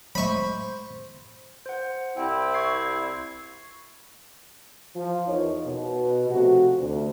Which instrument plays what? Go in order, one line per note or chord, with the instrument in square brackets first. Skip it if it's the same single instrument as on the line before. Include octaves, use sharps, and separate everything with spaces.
[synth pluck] F#3 G#3 A3 [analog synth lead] C5 [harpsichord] B5 C#6
[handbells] C5 F#5
[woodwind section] C2 C4 E4 [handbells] G5
[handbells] C#6 G#6 C7
[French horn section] F3
E2 D#4 A#4 C#5
B2
C3 F3 A3 F#4
D2